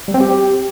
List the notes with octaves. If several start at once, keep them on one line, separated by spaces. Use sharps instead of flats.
G3
C4
G4